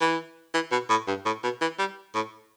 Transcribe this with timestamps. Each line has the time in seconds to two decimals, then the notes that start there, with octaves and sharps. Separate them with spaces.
0.01 E3
0.54 E3
0.72 B2
0.90 A2
1.08 G2
1.26 A2
1.43 B2
1.61 E3
1.79 G3
2.15 A2